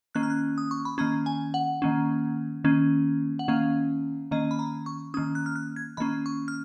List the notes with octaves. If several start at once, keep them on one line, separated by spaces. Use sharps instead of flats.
D#3 A#3 C#4 F#6
F6
F#6
D#6
C#6
B5
D#3 A#3 C#4 A#5
G#5
F#5
D#3 A#3 C#4
D#3 A#3 C#4
F#5
D#3 A#3 C#4 F5
D#3 A#3 C#4 D#5
B5
A#5
C#6
D#3 A#3 C#4 D#6
F#6
F6
F#6
G#6
D#3 A#3 C#4 B5
C#6
F6